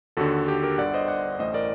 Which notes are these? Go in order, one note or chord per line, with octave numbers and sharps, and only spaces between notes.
D#2 D3 F#4 A4
G4
G4 A#4
G1 G2 D3 D5 F#5
C5 D#5
D5 F#5
A1 A2 C5 D#5
A#4 D5